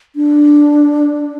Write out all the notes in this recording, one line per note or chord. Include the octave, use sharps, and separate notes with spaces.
D4